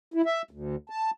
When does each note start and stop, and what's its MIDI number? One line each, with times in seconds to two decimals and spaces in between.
0.14 0.22 64
0.26 0.42 76
0.51 0.76 38
0.90 1.11 81